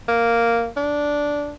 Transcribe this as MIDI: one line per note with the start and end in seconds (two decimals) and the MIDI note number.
0.08 0.68 58
0.77 1.53 62